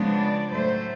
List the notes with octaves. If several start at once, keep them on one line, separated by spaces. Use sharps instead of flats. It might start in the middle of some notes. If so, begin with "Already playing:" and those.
Already playing: C#3 F3 G#3 B3 D4
D5
A2 F#3 A3 C5